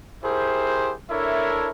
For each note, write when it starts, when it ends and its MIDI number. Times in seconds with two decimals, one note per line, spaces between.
0.24 0.94 64
0.24 0.94 67
0.24 0.94 68
0.24 0.94 70
0.24 0.94 72
1.11 1.70 62
1.11 1.70 64
1.11 1.70 69
1.11 1.70 70
1.11 1.70 73
1.11 1.70 76